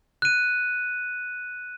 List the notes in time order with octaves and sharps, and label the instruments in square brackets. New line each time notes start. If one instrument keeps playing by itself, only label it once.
[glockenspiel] F#6 D#7